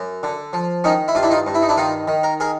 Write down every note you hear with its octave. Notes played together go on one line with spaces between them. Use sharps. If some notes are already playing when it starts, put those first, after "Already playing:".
Already playing: F#2
D3
F3
D#3 C#4 D#4
E4
G2 F4
D4 E4
D#4 F4
G2
E4
D#4
D4 E4
D#3 D#4 F4
D#3
A#4
G#4 A#4